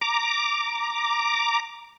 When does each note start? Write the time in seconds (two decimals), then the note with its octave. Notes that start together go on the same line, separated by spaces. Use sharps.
0.01 A#5 D6